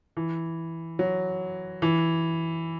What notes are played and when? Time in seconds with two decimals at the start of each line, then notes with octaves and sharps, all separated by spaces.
0.17 E3
0.99 F#3
1.82 E3